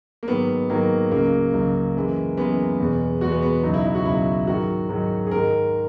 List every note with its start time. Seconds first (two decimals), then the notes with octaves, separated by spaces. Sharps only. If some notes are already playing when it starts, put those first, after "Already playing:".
0.23 A#3
0.27 G#2 D#3 F#3 B3
0.69 G#2 D#3 F#3 A#3
1.11 C#2 C#3 F#3 A#3
1.53 C#2 C#3 F#3
1.95 F#2 E3 G#3
2.37 F#2 E3 G#3 B3
2.80 E2 B2 G#3
3.21 E2 B2 G#3 F#4
3.32 B3
3.42 B3
3.63 C#2 B2 F#3 D#4
3.74 E4
3.84 E4
3.95 F#4
4.05 C#2 B2 F#3 E4
4.47 G#2 D#3 F#3 F#4
4.89 G#2 D#3 F#3
5.27 G#4
5.31 G#2 D#3 G#3 A#4